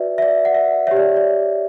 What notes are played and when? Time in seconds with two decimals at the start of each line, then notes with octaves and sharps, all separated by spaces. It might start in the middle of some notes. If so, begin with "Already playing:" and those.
Already playing: F#4 B4 D5 E5
0.18 E5
0.22 D5
0.45 F#5
0.55 E5
0.87 G4 C#5 E5
0.96 D5
1.16 D5